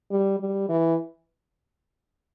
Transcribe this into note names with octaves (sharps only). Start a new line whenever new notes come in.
G3
G3
E3